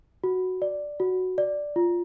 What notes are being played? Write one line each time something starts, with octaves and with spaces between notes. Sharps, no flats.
F#4
D5
F#4
D5
F4